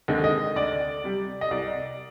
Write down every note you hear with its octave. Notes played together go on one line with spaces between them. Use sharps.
D#2 D3 G#3 C4
D#5
D2 D5
C3 G3
D#5
C2 D5